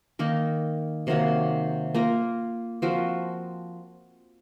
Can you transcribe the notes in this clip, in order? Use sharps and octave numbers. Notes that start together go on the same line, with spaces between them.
D#3 A#3 D#4 A#4
C3 D#3 F#3 A#3
A#3 F4 A#4
F3 C4 F#4 A#4